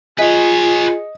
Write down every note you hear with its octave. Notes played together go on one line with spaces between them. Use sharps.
F4 G#4 B4 C#5 D#5